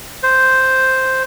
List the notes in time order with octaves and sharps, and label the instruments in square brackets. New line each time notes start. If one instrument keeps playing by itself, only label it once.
[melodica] C5